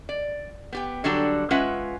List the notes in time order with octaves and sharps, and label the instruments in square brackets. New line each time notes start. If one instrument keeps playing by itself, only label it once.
[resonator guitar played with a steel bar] D5
B3 G4 G5
D3 F#3 G3 D4 F#4 A4
G#3 C#4 F4 B4 E5 F#5